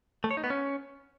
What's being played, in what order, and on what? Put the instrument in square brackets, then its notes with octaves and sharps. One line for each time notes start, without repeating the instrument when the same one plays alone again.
[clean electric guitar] A3
C#5
D#4
B3
C#4